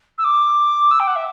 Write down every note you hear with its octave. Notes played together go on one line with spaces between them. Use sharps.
E6
D6
E6
G5
F#5
E5